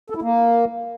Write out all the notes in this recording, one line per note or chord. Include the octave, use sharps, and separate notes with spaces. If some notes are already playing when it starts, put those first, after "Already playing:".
A4
E4
A#3